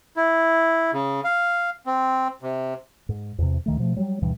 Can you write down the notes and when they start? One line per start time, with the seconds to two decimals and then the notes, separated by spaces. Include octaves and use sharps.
0.17 E4
0.93 C#3
1.24 F5
1.86 C4
2.43 C3
3.09 G#2
3.38 E2 C3
3.66 D2 D#3 A3
3.78 B2 F3 A3
3.97 F#3 G3
4.22 D2 G2 B2 E3